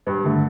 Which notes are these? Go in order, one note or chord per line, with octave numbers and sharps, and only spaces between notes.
G2
D3 A3